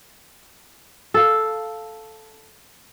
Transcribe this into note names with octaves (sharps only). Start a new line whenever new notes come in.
A4 F5